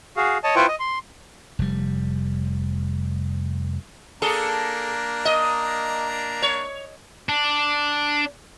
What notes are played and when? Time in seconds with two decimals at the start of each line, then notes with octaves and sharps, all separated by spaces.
0.17 F#4 G#4 F5
0.44 C#5 D#5 A5
0.56 E4 F4 B4 C5 G5 C#6
0.68 D#5
0.80 C6
1.59 F1 G3
4.22 A#3 D4 G#4 A4 A#5
5.25 D#5
6.42 C#5
7.29 D4